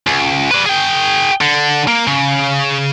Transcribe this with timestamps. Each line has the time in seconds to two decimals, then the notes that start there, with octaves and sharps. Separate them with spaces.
0.07 C#2
0.51 B4 D5
0.66 G#4 G5
1.41 D3
1.88 A#3
2.07 C#3